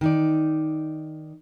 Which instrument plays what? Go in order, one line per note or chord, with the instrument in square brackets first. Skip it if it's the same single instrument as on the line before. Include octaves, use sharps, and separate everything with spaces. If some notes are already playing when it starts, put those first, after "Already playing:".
[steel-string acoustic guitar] D#3 D#4 D5